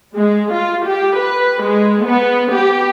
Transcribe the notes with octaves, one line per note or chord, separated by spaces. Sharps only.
G#3
F4
G4
B4
G#3
B3
G4